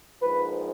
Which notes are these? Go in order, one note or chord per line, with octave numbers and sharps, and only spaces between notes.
A#1 G#2 F3 B4